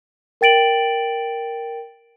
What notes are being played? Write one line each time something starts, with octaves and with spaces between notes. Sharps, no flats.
A#4 G5 A6 D7 F#7